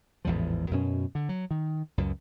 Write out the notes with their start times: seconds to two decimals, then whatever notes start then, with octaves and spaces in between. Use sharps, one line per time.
0.25 A1 E2 G#2 F3
0.71 F#2 B2 C#4
1.15 D3
1.29 F#3
1.51 D#3
1.98 C#2 F#2